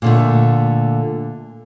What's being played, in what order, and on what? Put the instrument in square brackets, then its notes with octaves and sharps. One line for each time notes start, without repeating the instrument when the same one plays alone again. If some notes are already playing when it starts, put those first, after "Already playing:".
[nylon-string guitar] A#2 D3 A3